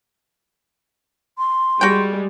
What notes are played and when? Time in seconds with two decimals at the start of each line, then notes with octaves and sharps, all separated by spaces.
1.38 C6
1.81 G3 G#3 F#4 G5